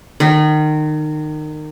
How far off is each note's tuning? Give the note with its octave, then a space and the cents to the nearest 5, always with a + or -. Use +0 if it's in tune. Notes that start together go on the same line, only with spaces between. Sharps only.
D#3 -25